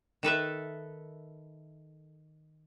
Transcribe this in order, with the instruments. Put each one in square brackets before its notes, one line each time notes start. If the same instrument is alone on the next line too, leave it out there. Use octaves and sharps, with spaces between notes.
[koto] D#3 A4 B4 E5